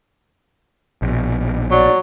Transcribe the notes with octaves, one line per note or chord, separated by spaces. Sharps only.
A#1 B2
F#3 D5